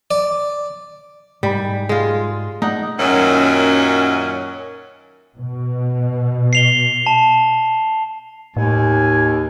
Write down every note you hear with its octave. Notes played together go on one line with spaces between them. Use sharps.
D5
G#2 G3 B5
G#3 F4
A3 D#4 D5 F#5
F#2 A#2 D#3 F#3 C#4
B2
C7 F7 G7
A5
D#2 A2 G#5